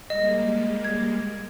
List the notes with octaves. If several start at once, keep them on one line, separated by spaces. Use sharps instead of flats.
G3 G#3 A#3 D#5
G#6